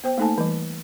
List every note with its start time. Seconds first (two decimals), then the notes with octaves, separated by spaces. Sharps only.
0.04 B3 C5 G5
0.18 A3 A#3 D#4 A4 G#5 A5
0.38 E3 G3